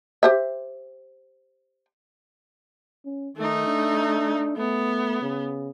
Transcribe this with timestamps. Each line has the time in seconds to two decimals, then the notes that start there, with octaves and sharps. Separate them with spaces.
0.23 G4 C5 E5
3.05 C#4
3.37 D#3 A3 D#4
3.67 D4
4.57 A3 B3
5.21 C#3